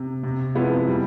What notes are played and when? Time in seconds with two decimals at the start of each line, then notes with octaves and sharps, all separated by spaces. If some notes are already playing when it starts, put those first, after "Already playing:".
Already playing: C3
0.23 C3
0.55 F3 G#3 B3 E4
0.88 G3